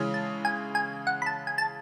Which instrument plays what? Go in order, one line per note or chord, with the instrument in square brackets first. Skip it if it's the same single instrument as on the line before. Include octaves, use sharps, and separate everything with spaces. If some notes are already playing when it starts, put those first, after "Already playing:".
Already playing: [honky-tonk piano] C#3 E3 G#3 C#4
[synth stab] A5
G#5
G#5
F#5
B5
A5
G#5
A5